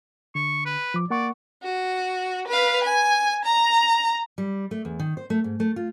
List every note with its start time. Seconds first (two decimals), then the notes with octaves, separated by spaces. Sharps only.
0.35 D3 C#6
0.66 B4
0.94 F3 D6
1.10 A#3 D5 F#5 C#6
1.63 F#4
2.48 B4 F5
2.84 G#5
3.45 A#5
4.38 G3
4.71 A3
4.85 E2
5.00 D#3
5.17 C5
5.30 A3
5.44 G#2
5.60 A3
5.76 F4